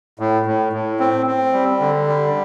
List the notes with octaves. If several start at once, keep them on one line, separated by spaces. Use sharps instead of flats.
A2
A2
A2
C4
C4
G3
D3
G3